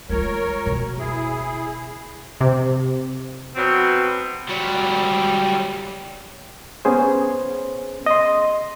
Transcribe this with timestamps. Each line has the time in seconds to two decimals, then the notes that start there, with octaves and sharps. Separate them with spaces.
0.09 G#3 F4 A#4 C#5
0.66 F#1 B2
0.99 E4 G#4
2.41 C3
3.56 B2 F#3 C4
4.49 F#3 G3
6.85 B3 C#4 G#4 C5
8.06 D#5 C6